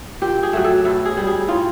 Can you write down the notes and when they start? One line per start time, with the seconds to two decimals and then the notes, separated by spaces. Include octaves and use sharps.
0.22 A#2 G4
0.43 G#4
0.53 F#3 A3
0.64 A4
0.85 B2 A4
1.05 G#4
1.17 G3
1.27 G#4
1.48 A2 F4